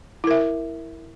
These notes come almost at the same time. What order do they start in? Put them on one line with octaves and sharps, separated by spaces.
E4 A#4 E5